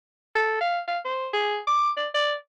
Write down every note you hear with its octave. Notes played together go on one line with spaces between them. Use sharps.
A4
F5
F5
C5
G#4
D6
D5
D5